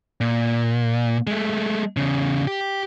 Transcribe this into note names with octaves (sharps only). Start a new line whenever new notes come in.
A#2
G#3 A3
E2 C#3
G4